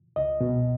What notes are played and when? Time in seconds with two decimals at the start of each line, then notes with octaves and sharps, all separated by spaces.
0.16 C#2 D#5
0.41 B2